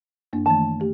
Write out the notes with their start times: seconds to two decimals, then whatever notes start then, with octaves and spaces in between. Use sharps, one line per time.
0.33 F#2 A#3 D4
0.46 D#3 E3 A3 A5
0.80 A3 G4